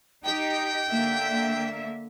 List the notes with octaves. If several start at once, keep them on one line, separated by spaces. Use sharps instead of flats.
D#4 G4 G5
D3 A#3 E5